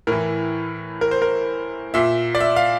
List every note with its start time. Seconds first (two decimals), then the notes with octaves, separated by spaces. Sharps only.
0.07 A2 E3 A#4
1.01 A#4
1.11 C5
1.22 A#4
1.94 A#2 E5
2.35 D5
2.40 E5
2.56 F5